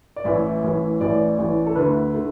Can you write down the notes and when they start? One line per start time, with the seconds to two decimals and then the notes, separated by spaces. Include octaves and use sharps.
0.16 D5
0.24 A1 A2 E3 E5
0.63 A1 A2 E3
1.00 A1 A2 E3 D5
1.38 A1 A2 E3
1.67 A4
1.75 D2 D3 A3 B4
2.14 D3 A3